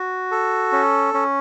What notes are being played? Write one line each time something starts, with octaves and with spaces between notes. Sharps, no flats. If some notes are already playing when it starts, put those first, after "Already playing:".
Already playing: F#4
A4
C#4
C#4